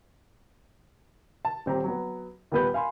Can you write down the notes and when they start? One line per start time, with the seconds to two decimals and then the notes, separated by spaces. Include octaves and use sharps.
1.45 A5
1.66 D#1 C4 G4 A#5
1.84 F#3 B3
2.52 D#2 A#2 G3 B3 B4 G6
2.74 F5 G#5 B5 C6